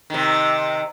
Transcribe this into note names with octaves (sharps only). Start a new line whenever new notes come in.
C3 D#3